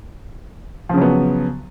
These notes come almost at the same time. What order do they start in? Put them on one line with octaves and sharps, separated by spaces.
F3 C#3 F#3 B3